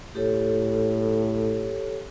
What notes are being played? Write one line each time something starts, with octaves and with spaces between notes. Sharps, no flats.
A2 G4 A4 C#5